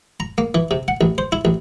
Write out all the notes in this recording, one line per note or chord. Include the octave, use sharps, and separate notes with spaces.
A#5
A#3
E3
C3
F#5
A1
C5
E4
A1